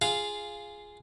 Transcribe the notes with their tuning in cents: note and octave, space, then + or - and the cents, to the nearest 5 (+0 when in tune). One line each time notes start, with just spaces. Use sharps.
F4 -5 G#4 +0 F5 -10